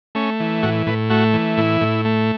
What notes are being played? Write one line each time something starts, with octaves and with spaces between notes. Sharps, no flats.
A3 C#4
E3
A2 F#4
A2 B4
A3 F#4
E3
A2 E4
A2
A3